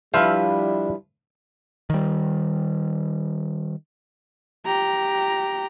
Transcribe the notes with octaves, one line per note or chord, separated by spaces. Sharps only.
F3 G3 D4 E4 B4 E5 F5
D#3 G3
G4 A#5